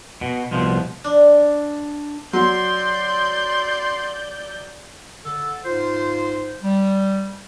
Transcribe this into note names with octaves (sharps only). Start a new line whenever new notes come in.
B2
C2 B2 F3
D4
F#3 D5 C6 G6
D3 A4
G#2 F4 C5
G3